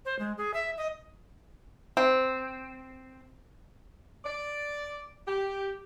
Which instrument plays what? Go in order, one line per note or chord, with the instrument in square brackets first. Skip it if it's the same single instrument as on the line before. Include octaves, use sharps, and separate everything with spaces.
[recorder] C5
G#3
G#4
E5
D#5
[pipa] C4
[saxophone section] D5
G4